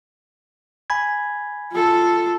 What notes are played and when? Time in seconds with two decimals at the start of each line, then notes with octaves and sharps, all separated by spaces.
0.90 G#5 B5 G#6
1.72 F4 A4